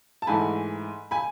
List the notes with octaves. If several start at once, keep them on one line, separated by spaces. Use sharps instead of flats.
A5
G#2 E3 A3 G#5 B5
G#5 B5